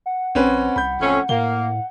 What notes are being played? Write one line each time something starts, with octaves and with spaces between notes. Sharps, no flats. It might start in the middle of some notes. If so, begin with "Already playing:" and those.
F#5
A#1 C4 C#4 B4
C2 B5 G6
D1 F2 A3 C#4
A2 A#3 F5 G7